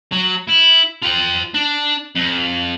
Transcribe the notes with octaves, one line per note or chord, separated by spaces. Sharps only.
F#3
E4
F4 G5
D4
F2